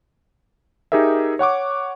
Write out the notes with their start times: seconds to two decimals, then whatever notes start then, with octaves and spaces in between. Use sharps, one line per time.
0.92 D#4 G4 G#4 A#4 E5
1.39 C#5 F#5 C#6 D6